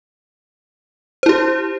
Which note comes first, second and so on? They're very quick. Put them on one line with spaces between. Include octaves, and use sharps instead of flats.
C5 E4 G4